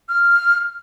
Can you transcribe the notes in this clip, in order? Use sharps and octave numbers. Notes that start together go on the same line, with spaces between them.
F6